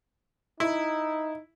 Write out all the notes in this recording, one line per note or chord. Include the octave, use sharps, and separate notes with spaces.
D#4 E4